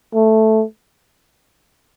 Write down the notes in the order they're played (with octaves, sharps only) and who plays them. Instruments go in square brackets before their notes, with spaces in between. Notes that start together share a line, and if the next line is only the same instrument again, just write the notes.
[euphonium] A3